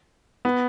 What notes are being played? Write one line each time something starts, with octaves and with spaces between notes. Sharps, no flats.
B3